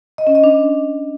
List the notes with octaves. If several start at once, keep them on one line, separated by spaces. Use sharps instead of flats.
D#5
C#4
D#5
D4